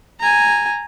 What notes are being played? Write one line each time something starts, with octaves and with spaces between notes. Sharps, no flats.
G#5 A#5